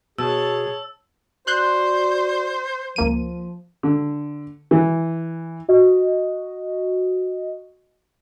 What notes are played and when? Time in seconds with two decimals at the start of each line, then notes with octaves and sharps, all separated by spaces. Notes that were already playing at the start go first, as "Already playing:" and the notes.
0.18 B2 G#4 C#5 A5 E6
1.47 F#4 C5 D5 C6 F#6 G6
2.96 C#2 F3 A#3 D#7
3.83 D3
4.71 E3
5.68 F#4 D#5